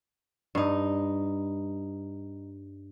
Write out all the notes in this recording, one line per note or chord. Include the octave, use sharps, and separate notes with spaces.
G2 D#4